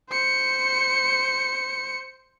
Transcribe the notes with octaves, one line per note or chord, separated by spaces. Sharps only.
C5 C#7